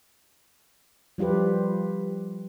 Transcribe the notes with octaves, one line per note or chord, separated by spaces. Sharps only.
F3 G3 F4 G4 B4